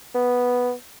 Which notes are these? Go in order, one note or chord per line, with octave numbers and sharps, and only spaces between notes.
B3